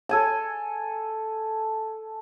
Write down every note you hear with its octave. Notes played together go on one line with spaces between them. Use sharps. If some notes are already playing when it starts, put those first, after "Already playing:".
A4 G#5 A5